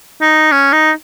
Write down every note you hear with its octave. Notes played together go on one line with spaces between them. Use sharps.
D#4
C#4
D#4